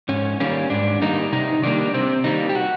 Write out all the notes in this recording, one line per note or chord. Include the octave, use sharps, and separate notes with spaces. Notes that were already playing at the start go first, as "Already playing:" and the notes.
G#2 C#4
D#3 G3 A#3 C#4
G#2 D4
D#3 G3 A#3 D#4
C3 D#4
D#3 G3 A#3 D4
C3 C4
D#3 G3 A#3 D#4
G4
F#4